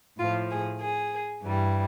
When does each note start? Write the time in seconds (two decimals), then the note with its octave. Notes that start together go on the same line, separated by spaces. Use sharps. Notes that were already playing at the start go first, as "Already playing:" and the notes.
0.18 A2 F3 F4
0.50 G#4
0.81 G#4
1.43 G2 E3 G3